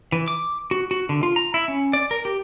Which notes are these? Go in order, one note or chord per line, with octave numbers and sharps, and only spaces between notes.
E3
D6
F#4
F#4
D3
F4
A#5
E4
C#4
D5
A#4
G4